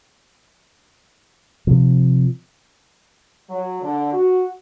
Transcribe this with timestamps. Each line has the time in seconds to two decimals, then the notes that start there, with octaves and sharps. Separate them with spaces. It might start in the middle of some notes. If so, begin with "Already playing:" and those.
1.67 C3 F3
3.49 F#3
3.83 D3
4.13 F#4